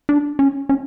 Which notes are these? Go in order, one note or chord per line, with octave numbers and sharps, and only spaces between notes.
D4
C#4
C#4